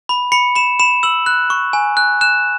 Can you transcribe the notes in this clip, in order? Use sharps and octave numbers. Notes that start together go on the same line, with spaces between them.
B5
B5 C#7
B5 E7
B5 E7
E6 F#7
F#6
C#6
G#5
F#6
F#6 E7